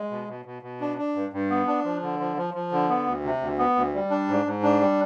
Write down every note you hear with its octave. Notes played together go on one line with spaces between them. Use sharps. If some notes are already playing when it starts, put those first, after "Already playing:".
Already playing: G#3
B2
B2
B2
B2
D4
D4
G2
G2
B3
D4
F3
D3
F3
F3
F3
D3
B3
D2
C3
D2
B3
D2
G3
D4
G#2
G#2
D4
G3